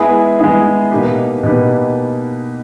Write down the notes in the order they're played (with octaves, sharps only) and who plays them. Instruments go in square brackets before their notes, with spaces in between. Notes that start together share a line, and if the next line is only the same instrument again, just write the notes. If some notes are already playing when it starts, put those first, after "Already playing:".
Already playing: [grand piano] G#3 B3 E4 G#4
G#3 B3 E4 G#4
B2 A#3 D#4 G4 B4
B2 A#3 D#4 G4 B4